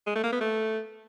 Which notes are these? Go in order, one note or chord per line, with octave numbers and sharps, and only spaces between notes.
G#3
A3
A#3
B3
A3